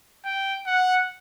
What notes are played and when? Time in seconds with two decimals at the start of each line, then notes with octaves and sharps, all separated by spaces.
0.24 G5
0.66 F#5